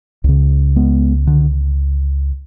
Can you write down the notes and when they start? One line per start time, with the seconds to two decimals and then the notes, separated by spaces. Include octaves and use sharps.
0.24 C#2 C#3
0.76 G#3 B3
1.27 D3